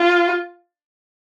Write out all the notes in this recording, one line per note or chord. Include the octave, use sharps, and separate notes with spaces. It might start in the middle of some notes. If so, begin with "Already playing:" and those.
Already playing: F4